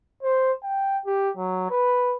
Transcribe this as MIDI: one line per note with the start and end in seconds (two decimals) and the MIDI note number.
0.23 0.52 72
0.64 0.98 79
1.06 1.30 67
1.37 1.69 54
1.70 2.16 71